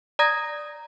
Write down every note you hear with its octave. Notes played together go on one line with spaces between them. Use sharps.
D5 A#5 D#6 G#6 A#6